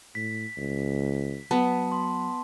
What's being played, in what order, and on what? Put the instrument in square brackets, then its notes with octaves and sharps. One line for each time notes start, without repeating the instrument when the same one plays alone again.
[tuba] A2 [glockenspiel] B6
[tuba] C#2
[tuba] F#3 [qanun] B3 [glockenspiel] A5
[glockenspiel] C6